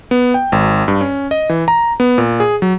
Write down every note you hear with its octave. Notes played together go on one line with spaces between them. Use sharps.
B3
G5
G#1
G2
C#4
D#5
E3
A#5
B3
A#2
G#4
F#3